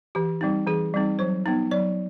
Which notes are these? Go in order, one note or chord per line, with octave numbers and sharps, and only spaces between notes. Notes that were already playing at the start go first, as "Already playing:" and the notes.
E3 G4
G3 C4 D#4
E3 G#4
G3 C4 D#4
F#3 C5
B3 D#4
F#3 D5